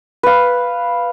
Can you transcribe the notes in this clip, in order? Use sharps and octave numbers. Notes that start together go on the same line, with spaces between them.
B4 F5